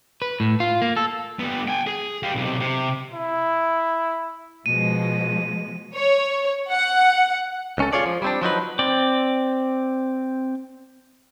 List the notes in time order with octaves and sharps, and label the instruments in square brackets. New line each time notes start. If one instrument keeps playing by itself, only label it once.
[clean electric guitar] B4
A2
F4
A#3
A4
[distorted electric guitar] G3 B3
G5 G#5
G#4
G4 F5
B1 C3
C3
[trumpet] E4
[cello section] B2 F3 G#3 [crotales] D#7
[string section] C#5
F#5
[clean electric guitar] C#2 C#4 A4
F4 G#4 C#5 D5
F3
G3 C4 D4
F3 F#3 D#4 B4
[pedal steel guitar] C4 D5